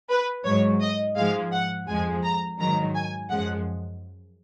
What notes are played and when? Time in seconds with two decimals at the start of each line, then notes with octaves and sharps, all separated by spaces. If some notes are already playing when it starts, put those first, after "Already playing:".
0.10 B4
0.45 G#2 F#3 C#5
0.81 D#5
1.17 G#2 F3 G#3 F5
1.52 F#5
1.88 F2 F3 G#3 G#5
2.24 A#5
2.59 G#2 D#3 F#3 A#5
2.95 G#5
3.30 F#2 F3 G#3 F#5